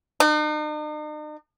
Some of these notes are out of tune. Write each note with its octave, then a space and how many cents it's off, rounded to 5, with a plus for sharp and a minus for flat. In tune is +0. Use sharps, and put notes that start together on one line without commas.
D#4 -45